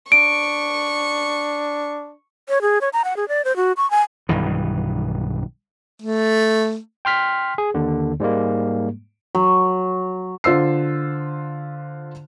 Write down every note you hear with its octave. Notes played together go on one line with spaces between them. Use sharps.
D4 C#6 D7
C#5
G#4
C#5
A#5
F#5
G#4
D5
C5
F#4
C#6
G#5
B1 G2 D#3 E3
A3
G5 C6 F6 B6
G#4
D#2 D3
G#2 G3 G#3 A#3
F#3
D3 F4 C5 E6 C7